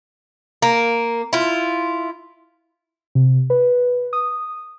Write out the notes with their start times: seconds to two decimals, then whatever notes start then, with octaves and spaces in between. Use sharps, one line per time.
0.62 A#3
1.33 E4 F4
3.15 C3
3.50 B4
4.13 D#6